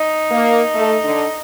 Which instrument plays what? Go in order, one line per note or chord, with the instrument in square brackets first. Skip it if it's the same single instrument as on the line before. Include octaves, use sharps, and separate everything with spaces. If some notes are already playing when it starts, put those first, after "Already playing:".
Already playing: [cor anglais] D#4
[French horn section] A#3
A3
D3